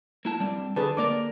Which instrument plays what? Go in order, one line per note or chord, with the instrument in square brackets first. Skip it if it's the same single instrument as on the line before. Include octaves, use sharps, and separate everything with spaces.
[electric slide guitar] A#3 E4 A5
G3 C4 D4
[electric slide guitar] D3 [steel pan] G#4 B4 A5
[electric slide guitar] D3 A#3 A#4 [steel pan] D5 D6